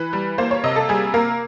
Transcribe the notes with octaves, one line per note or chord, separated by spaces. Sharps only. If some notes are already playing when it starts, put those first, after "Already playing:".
Already playing: E3 B4
G3
A#3 C5
C#5
C3 D#5
A4
G3 G#4
A#3 A#4